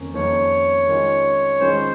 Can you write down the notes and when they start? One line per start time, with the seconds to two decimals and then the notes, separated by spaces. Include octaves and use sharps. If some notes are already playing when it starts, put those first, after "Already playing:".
Already playing: F2 D#3 A#3 C#4
0.14 F2 D#3 A#3 C#4 C#5
0.87 D#3 G#3 C#4 F4
1.60 D#3 G#3 C#4 F4 C5